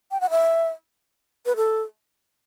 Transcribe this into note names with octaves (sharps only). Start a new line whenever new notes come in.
G5
F#5
E5
B4
A4